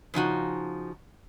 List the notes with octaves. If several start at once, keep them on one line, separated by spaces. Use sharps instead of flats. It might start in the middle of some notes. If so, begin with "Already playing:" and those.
C#3 F3 D#4 F#4